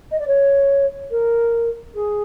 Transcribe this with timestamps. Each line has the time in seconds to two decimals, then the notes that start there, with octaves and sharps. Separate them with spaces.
0.11 D#5
0.19 D5
0.27 C#5
1.10 A#4
1.94 G#4